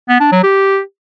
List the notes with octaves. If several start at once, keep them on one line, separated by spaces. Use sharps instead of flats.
B3
D4
F#3
G4